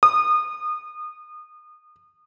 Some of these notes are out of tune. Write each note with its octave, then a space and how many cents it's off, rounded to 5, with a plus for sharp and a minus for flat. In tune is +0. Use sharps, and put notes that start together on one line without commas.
D#6 -30